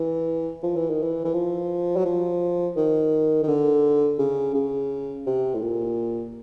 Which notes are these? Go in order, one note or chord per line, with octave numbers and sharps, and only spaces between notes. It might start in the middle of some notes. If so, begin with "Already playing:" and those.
Already playing: E3
F3
E3
D#3
E3
E3
F3
F#3
F3
D#3
D#3
D3
C#3
C#3
C3
A2
A#2